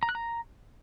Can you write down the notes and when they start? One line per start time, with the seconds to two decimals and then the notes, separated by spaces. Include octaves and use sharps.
0.03 A#5
0.09 F#6
0.15 A#5